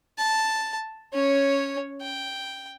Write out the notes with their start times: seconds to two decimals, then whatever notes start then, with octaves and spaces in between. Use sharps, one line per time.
0.18 A5
1.13 C#4 C#5
2.01 G5